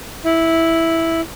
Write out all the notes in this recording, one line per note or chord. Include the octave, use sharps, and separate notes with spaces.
E4